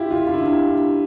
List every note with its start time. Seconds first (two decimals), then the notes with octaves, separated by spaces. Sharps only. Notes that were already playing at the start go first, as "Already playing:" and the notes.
Already playing: E4 F4 G4
0.10 F4
0.27 F4
0.34 E4
0.41 D4